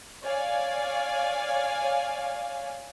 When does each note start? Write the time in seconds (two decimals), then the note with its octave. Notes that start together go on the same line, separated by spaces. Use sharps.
0.23 C#5 D5 F5 G#5